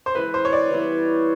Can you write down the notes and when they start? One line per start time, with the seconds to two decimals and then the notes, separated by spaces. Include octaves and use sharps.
0.06 C5
0.15 E3 G#3 C#4 E4 B4
0.34 C5
0.45 C#5
0.53 D5
0.70 E3 G3 B3 E4